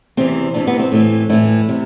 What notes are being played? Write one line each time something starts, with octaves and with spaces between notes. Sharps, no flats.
E2 C3 E3 C4
E2 C3 E3 D4
B3
C4
A2 E3
A2 E3 E4
C3